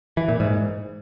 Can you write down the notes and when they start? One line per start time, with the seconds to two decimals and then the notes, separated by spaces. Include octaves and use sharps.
0.17 E3
0.29 A#2
0.40 G#2